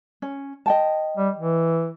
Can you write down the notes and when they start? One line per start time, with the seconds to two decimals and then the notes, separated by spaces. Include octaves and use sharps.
0.22 C#4
0.66 D#5 G5 A5
1.17 G3
1.37 E3